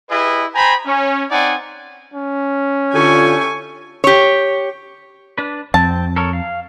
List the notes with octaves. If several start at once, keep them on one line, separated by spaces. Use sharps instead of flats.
E4 G4 G#4 B4 D#5
C5 G5 G#5 A#5 B5
C#4
C4 D#4 D5 F#5 G#5
C#4
D3 E4 F4 G4 A4 G#5 C#6
G4 C#5
D4 B4
F2 C4 A5
A4 A#4 C#5
F5